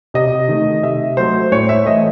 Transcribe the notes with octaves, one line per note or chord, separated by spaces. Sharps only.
C3 D#5
D#3 A3
C3 E5
F#3 A3 C5
A2 C#5
E5
E3 A3 D#5